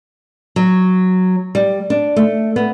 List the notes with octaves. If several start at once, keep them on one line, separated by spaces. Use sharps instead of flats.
F#3
G3
D4
A3
B3